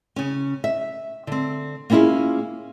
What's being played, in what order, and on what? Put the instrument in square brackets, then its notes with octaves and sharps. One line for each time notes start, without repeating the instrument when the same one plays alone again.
[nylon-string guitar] C#3 C#4
E5
D3 C4
A#3 B3 C#4 E4 F4 G#4